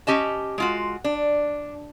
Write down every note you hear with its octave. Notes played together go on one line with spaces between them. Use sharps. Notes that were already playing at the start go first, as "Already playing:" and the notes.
C#4 G4 D#5 A5
G#3 F4 F#4
D4